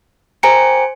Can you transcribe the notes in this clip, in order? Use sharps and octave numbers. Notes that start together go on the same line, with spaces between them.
G4 A#4 C5 G#5 C#7